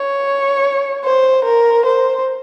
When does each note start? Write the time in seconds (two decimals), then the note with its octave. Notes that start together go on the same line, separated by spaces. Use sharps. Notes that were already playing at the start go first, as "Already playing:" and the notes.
Already playing: C#5
1.04 C5
1.45 A#4
1.85 C5